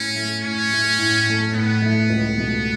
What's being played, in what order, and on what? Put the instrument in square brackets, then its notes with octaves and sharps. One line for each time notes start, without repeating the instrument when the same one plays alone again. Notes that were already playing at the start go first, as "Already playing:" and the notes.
Already playing: [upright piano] A2 [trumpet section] C#4
[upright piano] A3 E4
[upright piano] A2 [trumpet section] C#4
[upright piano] A3 E4
A2
A3 E4
[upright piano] A2 [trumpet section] B3
[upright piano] A3 E4
C#2
B2 A3